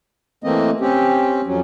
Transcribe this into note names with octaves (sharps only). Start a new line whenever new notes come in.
E3 A3 A#3 C4 D#5
C4 C#4 G4
F2 F#3 C#4